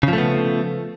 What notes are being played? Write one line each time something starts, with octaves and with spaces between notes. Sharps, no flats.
C#3 F3 A3 B3